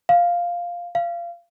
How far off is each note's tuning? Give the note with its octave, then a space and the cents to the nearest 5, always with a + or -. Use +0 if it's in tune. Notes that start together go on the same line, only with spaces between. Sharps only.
F5 +0
F5 -25